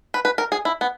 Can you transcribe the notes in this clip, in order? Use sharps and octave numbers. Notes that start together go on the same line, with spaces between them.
B4
B4
A#4
G#4
E4
B3